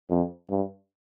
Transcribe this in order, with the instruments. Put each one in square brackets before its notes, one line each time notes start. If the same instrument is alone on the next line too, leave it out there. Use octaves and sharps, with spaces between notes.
[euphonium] F2
G2